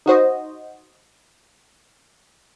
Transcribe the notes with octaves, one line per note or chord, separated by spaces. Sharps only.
D#4 F#4 C5 D#5